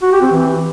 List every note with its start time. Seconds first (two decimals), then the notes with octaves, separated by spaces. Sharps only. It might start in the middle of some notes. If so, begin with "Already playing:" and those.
0.02 F#4
0.12 G4
0.22 C4
0.32 E3